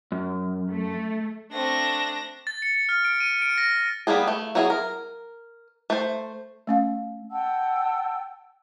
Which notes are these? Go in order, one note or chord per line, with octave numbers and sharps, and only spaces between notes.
F#2
A3
A3 C4 D4 A#6
A6
C#7
F6
D7
D#7
D7
A#6
G3 A#3 B3 G#4
A3
F#3 B3 E4 F4 G#4
A#4
A3 C5
A3 C#4 F5
F#5 G5 A5 E6